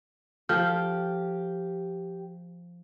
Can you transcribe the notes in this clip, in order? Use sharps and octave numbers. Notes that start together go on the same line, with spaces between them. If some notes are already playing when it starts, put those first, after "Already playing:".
F3 G4 A4 F6 G6